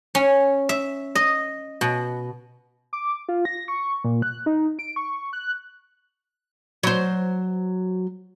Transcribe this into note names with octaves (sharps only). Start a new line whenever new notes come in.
C#4
E5
D#5
B2
D6
F4
A#6
C#6
A#2
F#6
D#4
D7
C#6
F#6
F#3 C5